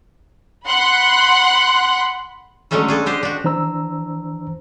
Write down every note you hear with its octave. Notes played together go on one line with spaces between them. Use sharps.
F#5 B5 C6 F#6
D3 F#3 G#3 A3 C#4 A4
D4 G#4 A4
D4 G4 C5 D#5
D4 F#4
E3 D4 C5 A#5 E6